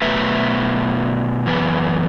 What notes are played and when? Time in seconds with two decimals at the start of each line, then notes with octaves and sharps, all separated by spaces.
0.02 B2 F#3 A3 B4 E5
1.46 F#2 E3 B3